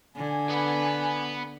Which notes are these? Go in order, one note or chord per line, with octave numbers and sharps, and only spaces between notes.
D3 G#5
B3 B4